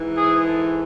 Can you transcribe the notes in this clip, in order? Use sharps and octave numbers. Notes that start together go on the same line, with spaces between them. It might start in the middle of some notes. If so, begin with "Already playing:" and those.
Already playing: G#2 E3
G#4
A4